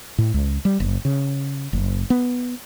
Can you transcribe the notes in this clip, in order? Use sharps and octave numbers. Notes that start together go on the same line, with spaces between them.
A2
C#2
G3
F#1
C#3
F#1
B3